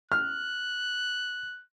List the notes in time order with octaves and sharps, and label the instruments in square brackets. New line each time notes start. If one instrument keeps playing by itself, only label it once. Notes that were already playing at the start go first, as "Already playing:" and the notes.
[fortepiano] F6 [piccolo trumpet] F#6